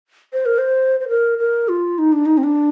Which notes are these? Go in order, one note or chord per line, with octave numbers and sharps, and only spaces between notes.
C5
A#4
C5
C5
A#4
A#4
F4
D#4
D4
D#4
C4
D4